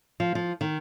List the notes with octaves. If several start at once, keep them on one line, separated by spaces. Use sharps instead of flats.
F3
F3
D#3